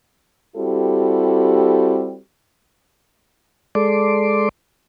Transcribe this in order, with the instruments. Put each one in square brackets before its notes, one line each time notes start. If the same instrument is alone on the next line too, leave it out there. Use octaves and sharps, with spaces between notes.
[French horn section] G3 C4 E4 F#4 G4 A4
[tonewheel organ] G#3 A4 D5 C6 D6